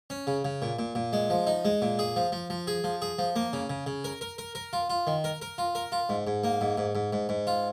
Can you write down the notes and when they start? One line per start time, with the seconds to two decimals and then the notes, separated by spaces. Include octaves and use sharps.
0.10 C#4
0.27 C#3
0.45 C#3
0.62 A#2
0.79 A#2
0.95 A#2
1.13 G#3
1.30 F3
1.47 D#4
1.65 G#3
1.82 A#2
1.99 G#4
2.16 F3
2.32 F3
2.50 F3
2.67 G#4
2.84 F3
3.02 G#4
3.19 F3
3.36 A#3
3.53 C#3
3.70 C#3
3.86 C#3
4.04 A#4
4.21 A#4
4.38 A#4
4.55 A#4
4.73 F4
4.90 F4
5.07 D#3
5.24 A#4
5.42 A#4
5.58 F4
5.75 A#4
5.92 F4
6.09 G#2
6.27 G#2
6.44 A#3
6.61 G#2
6.78 G#2
6.95 G#2
7.13 G#2
7.29 G#2
7.47 F4